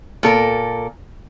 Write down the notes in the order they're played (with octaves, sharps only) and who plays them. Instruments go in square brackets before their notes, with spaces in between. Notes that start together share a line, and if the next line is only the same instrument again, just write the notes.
[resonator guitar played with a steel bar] A#2 A4 A#4